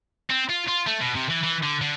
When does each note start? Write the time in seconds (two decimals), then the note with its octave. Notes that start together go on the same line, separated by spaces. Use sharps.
0.30 C4
0.49 F4
0.68 F4
0.87 A3
1.01 B2
1.15 C3
1.30 E3
1.43 E3
1.63 D3
1.81 D3